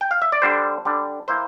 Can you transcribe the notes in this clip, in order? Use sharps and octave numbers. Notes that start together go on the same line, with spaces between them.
G5
F5
E5
D5
D3 G3 D4 C5
D3 G3 D4
E3 A#3 E4 C5